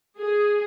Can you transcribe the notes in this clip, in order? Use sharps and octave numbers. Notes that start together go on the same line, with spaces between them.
G#4